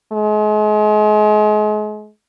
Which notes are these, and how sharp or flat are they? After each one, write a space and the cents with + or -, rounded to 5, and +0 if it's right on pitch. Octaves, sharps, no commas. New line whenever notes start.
G#3 +35